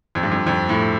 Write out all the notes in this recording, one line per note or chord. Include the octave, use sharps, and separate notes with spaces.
F2
G2
F2
F2
A2